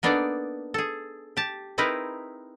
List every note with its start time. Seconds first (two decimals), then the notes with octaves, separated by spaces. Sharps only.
0.03 A#3 B3 D4 D#4 A4 D5
0.74 G#4 A4
1.37 G4 A5
1.78 C4 D#4 E4 G#4 A#4 B4